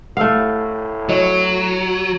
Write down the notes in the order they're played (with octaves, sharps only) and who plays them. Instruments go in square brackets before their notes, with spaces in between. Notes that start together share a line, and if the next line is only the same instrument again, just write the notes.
[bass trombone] A2 [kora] A3 F5 [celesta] F#5 E6
[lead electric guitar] F#3 [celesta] E4 C#5 D#5